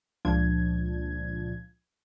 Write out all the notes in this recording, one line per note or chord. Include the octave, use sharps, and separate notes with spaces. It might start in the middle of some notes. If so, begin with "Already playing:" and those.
C#2 A#2 F3 D4 G#6